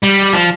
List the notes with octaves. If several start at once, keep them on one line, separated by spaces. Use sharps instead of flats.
G3
F3